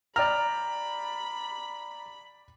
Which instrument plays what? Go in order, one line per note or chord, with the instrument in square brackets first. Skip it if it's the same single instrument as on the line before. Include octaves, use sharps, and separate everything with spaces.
[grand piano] D5 G5 F6 [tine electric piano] A#5 [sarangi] B5